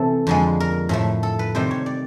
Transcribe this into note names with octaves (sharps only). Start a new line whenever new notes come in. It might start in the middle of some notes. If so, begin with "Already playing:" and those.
Already playing: C3 E3 A3 A4
F2 D3 F3 G#3
A#4
A2 F3 A3
A4
B4
C3 D#3 G3 C5
C#5
D5